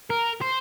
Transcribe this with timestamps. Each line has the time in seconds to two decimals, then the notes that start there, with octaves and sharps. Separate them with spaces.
0.10 A#4
0.41 C5